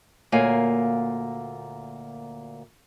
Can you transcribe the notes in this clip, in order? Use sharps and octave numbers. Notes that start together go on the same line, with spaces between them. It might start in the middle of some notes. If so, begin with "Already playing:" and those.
D2 A#2 A#3 C#5 F5 G#5